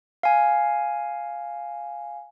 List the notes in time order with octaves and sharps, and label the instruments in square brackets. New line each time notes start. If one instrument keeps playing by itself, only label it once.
[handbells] F5 G#5